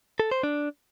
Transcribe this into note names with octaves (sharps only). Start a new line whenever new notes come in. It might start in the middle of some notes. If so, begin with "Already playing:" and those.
A4
C5
D4